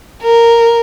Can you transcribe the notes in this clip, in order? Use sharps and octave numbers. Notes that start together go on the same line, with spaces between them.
A#4